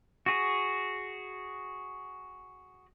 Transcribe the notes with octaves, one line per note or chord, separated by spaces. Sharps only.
F#4 G#4